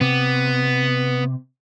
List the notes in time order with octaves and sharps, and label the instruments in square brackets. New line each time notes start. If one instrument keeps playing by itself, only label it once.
[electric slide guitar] C3 [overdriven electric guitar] B3